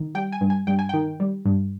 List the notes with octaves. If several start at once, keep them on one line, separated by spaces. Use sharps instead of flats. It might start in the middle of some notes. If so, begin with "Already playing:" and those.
Already playing: D#3
G3 G5
G#5
G2
G#5
G2 G5
G#5
D#3 G5
G3
G2